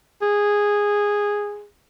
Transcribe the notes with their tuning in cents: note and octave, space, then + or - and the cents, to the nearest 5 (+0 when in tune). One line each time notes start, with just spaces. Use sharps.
G#4 -10